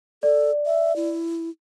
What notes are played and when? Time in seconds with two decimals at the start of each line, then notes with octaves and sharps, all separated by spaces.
0.23 A4 D5
0.66 E5
0.96 E4